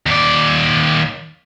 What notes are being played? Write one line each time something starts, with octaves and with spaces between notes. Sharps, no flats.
D#2 D5